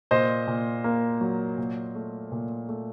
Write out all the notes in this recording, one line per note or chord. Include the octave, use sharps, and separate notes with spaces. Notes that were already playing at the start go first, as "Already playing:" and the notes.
A#2 C5 D#5
A#2
A#3
F#3
A#2
A3
A#2
A3